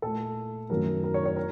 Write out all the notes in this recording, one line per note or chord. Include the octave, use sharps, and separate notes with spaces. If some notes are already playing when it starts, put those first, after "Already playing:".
A#2 A3 A4
F#2 D#3 F#3 A3 A#4
A#4
C#5
C#5
A#4